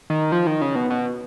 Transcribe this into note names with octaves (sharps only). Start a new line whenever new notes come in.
D#3
F3
D#3
C#3
B2
B2